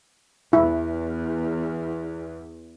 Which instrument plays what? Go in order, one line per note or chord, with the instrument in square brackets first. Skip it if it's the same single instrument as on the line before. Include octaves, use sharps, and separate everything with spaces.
[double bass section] E2 [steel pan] E4